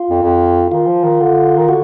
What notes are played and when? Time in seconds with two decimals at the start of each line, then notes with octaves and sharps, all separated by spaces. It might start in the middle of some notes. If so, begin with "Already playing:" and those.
Already playing: F4
0.10 F2
0.23 F2
0.72 D#3 F4
0.87 F3
1.03 D#3
1.20 D3
1.57 D#3
1.69 D3 F#4